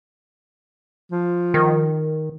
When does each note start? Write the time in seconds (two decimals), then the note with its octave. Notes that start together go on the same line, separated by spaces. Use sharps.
1.12 F3
1.54 D#3